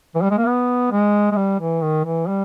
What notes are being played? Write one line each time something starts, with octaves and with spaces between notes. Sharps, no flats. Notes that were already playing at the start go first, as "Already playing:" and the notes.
E3
G3
G#3
A#3
B3
G#3
G#3
G3
E3
D#3
E3
G3